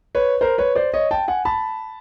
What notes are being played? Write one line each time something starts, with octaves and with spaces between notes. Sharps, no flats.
B4 C#5
A#4 C5
B4 C#5
C5 D5
C#5 D#5
G5 A5
F#5 G#5
A5 B5